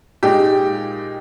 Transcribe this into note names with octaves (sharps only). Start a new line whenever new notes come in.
A#2 G#3 D#4 G4